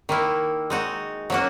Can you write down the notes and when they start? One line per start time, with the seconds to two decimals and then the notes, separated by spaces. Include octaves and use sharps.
0.09 D#3 A#3 E4
0.70 G#3 D#4 F#4
1.30 F#3 A#3 C#4 F#4